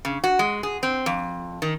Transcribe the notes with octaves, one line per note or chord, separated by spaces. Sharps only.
C#3
F#4
G#3
G#4
C4
F2
D#3